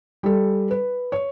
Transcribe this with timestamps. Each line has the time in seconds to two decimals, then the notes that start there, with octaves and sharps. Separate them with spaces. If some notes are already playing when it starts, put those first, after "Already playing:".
0.23 G3 A4
0.71 B4
1.12 C#5